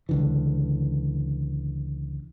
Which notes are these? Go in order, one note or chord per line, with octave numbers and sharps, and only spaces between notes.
C#2 D3 E3